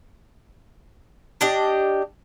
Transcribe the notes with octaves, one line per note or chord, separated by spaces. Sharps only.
D4 G4 D#5